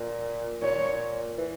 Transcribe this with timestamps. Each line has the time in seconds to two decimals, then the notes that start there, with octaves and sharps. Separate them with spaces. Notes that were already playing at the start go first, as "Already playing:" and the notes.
Already playing: A#2
0.62 A#2 C#5
1.38 E3